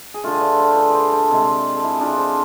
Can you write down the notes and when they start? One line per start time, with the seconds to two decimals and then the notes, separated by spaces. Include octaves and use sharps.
0.14 G#4
0.24 D3 A3 F4 A4
0.41 B4 D5
0.59 A4 C5
0.71 C5
0.76 G#4 B4
0.90 A4 C5 D5
1.12 A4 C5
1.31 C3 G#3
1.76 A4
1.83 E4 G#4
2.01 D4 F4
2.18 A4 C5